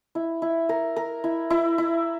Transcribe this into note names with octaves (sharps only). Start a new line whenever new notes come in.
E4
E4
A#4
A#4
E4
E4
E4